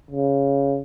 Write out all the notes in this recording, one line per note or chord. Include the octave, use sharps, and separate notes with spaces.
C#3